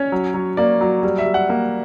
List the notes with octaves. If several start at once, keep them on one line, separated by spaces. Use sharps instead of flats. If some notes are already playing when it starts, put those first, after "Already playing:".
Already playing: C#4 C#5
F#3
F#3
A#3 D5
F#3
G3
E5
G3
F#5
A#3